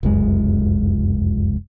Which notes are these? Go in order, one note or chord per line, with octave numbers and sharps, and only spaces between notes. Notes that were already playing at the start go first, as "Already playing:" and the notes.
F1 C#2 F#2 G#3